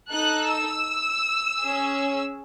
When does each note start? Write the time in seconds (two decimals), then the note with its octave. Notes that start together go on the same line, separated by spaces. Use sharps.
0.12 D#4 A4 F#6
0.49 E6
1.63 C#4 G#4